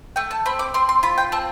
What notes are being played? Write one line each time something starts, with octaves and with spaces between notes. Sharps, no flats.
A3 G5
A5
C4 B5
D6
C4 C6
C6
F4 B5
G5
C4 A5